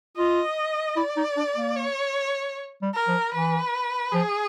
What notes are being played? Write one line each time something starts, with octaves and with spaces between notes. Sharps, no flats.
F4 D#5
E4 D5
D#4
D4
A#3
C#5
G3
A#4
F3
E3 B4
F3 G#4